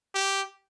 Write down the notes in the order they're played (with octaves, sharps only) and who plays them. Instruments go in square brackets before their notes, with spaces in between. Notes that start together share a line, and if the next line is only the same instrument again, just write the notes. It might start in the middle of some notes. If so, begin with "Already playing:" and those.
[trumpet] G4